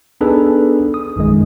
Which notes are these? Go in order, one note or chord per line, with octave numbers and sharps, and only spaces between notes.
B3 D4 D#4 G#4 A4 B4
D#6
A#1 F#2 D#3 G#3